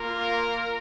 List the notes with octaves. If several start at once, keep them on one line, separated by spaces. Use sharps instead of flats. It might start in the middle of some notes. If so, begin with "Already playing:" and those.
Already playing: A#3 F4 A#4